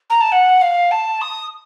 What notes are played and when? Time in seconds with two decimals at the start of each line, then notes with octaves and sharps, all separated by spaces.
0.09 A#5
0.20 A5
0.32 F#5
0.61 F5
0.91 A5
1.21 D#6